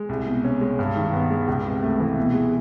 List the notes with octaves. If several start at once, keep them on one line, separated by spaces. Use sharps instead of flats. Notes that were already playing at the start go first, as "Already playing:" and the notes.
Already playing: G#3
C2
B2
C#4
G#3
G2
D#3
B3
G#3
C#2
C3
A3
E3
B2
G#3